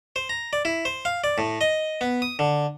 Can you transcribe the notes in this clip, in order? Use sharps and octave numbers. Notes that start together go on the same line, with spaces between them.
C5
A#5
D5
E4
C5
F5
D5
A2
D#5
B3
D#6
D3